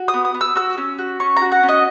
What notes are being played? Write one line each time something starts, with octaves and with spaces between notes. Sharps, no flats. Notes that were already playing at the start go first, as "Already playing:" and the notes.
Already playing: F#4
D#6
B3
D#6
B3
E6
F#4 E6
C#4
F#4
C#4 C#6
A#5
F#4
F#5
C#4
D#5